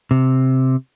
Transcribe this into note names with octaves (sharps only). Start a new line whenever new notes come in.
C3